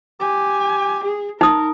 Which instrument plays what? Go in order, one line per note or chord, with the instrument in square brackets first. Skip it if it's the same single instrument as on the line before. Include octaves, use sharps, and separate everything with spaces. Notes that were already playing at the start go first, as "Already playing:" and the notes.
[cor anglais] G4 [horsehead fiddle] G#5
[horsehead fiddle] G#4
[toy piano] D#4 D#6 [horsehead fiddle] A#4